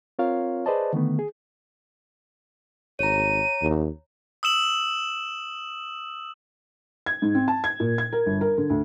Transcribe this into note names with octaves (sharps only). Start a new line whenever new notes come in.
C4 F4 A#4 C#5 F5
G#4 B4 C5 D5 D#5 A5
D3 D#3 A3 B3
G#4
G#1 C#5 A#5 D#7
D#2
D#6 E6 E7 F#7
G#6
G#2
C4
A5
G#6
A#2
G#6
A#4
G1
A#4
D3
D2